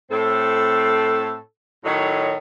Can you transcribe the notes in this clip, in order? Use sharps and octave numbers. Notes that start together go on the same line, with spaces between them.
A2 C4 A4
A2 D#3 F#3 A4 C#5 D#5